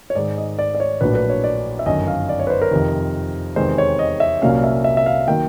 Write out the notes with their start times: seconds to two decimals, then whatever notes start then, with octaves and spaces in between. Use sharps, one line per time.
0.10 C#5
0.15 G#2 D#3 G#3 D5
0.38 D#5
0.59 D5
0.75 D5
0.80 C#5
1.01 A#1 A2 F#3 A#3 D4 B4
1.15 B4
1.30 C#5
1.44 D5
1.79 E5
1.86 G1 F#2 D#3 D#5
2.07 F5
2.29 D5
2.40 C#5
2.47 B4
2.50 C5
2.61 A#4
2.71 F2 C3 D#3
3.56 E2 C3 D#3 G#3 C4 C5
3.78 C#5
3.99 D#5
4.20 E5
4.42 C2 A#2 F#3 A#3 C#4 F5
4.64 E5
4.84 E5
4.97 E5
5.06 F5
5.28 D#3 F#3 A#3 G5